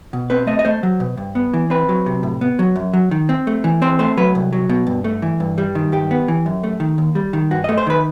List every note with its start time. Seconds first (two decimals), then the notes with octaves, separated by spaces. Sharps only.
0.13 B2
0.30 C4 B4
0.47 A3 D#5
0.59 D#5
0.65 A3 C5
0.83 F#3
1.00 B2
1.17 G2
1.35 B3
1.53 E3
1.70 C4 B4
1.89 F#3
2.06 C3
2.23 A2
2.41 B3
2.59 F#3
2.76 F#2
2.93 F#3
3.11 D#3
3.29 C4
3.47 A3
3.64 E3
3.82 C4 C5
3.99 A3 C5
4.17 F#3 B4
4.35 C2
4.53 F#3
4.69 B2
4.87 G2
5.04 A3
5.22 E3
5.40 G2
5.58 G3
5.75 D#3
5.92 G2 G4
6.11 B3
6.28 E3
6.46 F#2
6.64 A3
6.80 D#3
6.98 D#2
7.15 G3
7.33 D#3
7.51 G2 F#4
7.64 D#5
7.69 A3
7.78 C5
7.87 D#3 B4